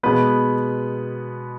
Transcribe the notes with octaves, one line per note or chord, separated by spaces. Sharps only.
B2 G#3 B3 B4